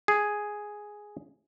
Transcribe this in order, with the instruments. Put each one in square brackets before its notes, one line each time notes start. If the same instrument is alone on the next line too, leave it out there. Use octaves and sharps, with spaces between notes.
[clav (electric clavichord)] G#4